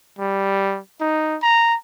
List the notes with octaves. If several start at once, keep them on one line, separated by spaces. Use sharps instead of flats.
G3
D#4
A#5